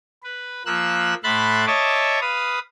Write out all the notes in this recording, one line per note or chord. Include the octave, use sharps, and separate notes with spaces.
B4
F3 A#3 E6 F#6
A2 E5 B5 C6 F#6 A6
C#5 D#5 E5 A5 D6
B4 F5 D#6